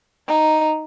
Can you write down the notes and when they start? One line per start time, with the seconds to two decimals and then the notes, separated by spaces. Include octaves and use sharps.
0.27 D#4